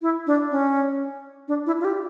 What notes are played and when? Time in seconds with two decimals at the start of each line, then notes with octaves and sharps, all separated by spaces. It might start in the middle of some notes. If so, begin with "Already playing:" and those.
0.02 E4
0.27 D4
0.51 C#4
1.48 D4
1.66 E4
1.80 F4
1.85 G4